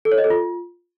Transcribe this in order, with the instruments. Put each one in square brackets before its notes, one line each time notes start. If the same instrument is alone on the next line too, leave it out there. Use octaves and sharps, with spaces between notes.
[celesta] A4
C#5
D#5
A4
F4